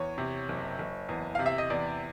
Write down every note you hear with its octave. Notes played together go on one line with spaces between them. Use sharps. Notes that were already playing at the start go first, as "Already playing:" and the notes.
Already playing: E2 C#5
C3
F#1
F#1
E2
C3 F5
E5
D#5
E2 D5